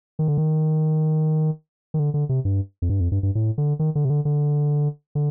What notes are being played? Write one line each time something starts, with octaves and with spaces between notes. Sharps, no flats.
D#3
D3
D#3
D#3
D3
D3
C3
G2
F2
G2
F2
G2
G2
A2
D3
D#3
D3
C3
D3
D3
D3